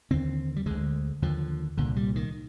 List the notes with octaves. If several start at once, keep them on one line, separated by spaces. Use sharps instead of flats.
D#2 D3 C4
G3
D2 D3 G#3
D#2 D3 F3
C2 A#2 D3
G3
D#3